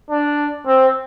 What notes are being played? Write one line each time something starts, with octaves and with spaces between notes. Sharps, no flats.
D4
C4